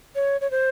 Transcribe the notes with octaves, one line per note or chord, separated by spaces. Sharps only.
C#5
C#5
C5